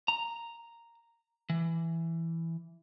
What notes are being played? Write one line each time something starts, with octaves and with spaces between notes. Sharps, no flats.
A#5
E3